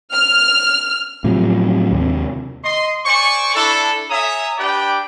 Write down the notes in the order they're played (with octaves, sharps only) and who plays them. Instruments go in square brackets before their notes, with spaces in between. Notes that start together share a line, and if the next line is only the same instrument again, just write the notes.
[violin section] F6
[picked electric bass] A2 C3 F3 F#3
D#2 C3
[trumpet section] D#5 C6
C5 D5 G#5 C#6
D4 E4 A4
C#5 E5 G#5 A#5 D#6
D4 G4 B4 D5 G5